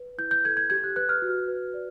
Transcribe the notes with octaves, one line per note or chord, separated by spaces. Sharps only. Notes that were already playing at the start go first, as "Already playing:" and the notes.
Already playing: B4
E4 G6
G6
A4 G#6
G#6
G4 G#6
F#6
B4 F#6
F6
F#4
B4
D5